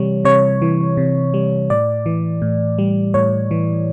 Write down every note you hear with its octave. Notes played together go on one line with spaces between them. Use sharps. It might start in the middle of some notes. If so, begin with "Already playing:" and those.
Already playing: C3 E3 G3 C#5
C3 C#5
E3
C3
G3
A2 D5
E3
A2
G3
A2 C#5
E3